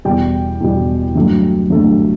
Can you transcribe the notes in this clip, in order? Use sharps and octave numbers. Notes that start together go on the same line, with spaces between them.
E2 B2 G3 G5
E2 B2 G3
G2 F#3 A3
G2 F#3 A3